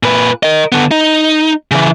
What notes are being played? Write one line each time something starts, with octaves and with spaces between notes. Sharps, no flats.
A#2 B4
A#4 D#5
D3 B3
D#4
C#3 E3